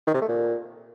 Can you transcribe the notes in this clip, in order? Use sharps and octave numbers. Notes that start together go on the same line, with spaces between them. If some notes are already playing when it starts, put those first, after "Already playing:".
D#3
C3
A3
A#2